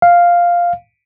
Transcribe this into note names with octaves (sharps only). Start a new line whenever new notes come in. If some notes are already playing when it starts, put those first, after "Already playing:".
F5